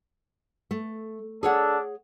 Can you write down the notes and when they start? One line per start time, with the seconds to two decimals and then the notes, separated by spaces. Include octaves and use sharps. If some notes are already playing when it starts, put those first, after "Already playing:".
0.71 A3
1.43 D4 G#4 A4 C#5 F#5